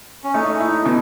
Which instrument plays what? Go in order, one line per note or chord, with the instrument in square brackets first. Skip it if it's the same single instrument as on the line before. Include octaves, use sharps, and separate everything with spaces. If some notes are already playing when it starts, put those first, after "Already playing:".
[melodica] C#4
[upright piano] A3 [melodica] D#4
[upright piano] E4
B2